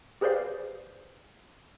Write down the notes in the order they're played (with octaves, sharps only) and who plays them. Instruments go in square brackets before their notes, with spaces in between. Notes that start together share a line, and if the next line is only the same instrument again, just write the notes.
[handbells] G4 G#4 B4 C5 D5 F5